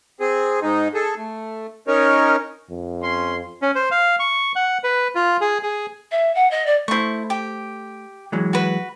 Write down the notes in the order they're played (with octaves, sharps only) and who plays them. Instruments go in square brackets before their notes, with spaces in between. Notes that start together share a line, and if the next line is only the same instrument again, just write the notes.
[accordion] C4 G#4
G#2 D#4
G#4 A4
A3
C#4 D#4 A#4 C#5
[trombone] F2
[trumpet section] C#4 C6
[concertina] C#4
C5
F5
C#6
F#5
B4
F4
G#4
G#4
[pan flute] E5
F#5
D#5
D5
[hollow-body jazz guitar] A3 C5 [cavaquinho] E4 C#6
[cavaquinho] G4
[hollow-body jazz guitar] E3 F#3 G#3
[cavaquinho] F#4 B4